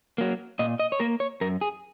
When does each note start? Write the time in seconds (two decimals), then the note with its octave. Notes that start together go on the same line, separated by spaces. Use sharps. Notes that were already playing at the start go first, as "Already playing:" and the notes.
0.18 F#3 A#3
0.59 A#2 D#5
0.80 D#5
0.92 C#5
1.00 A#3 A#4
1.20 C#5
1.41 F#2 A#4
1.61 G#4